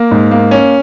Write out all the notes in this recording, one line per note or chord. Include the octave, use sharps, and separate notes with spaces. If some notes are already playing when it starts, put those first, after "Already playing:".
Already playing: A#3
G#2
A#3
C#4